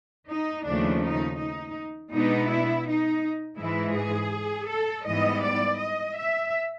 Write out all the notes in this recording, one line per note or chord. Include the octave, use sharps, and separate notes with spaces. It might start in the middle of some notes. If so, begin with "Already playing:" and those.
D#4
D#2 C#3 F3 A3 D4
D#4
D#4
B2 G#3 B3 D4 D#4
E4
D#4
G#2 E3 G#3 E4
G#4
A4
G#2 E3 G3 B3 D#5
D5
D#5
E5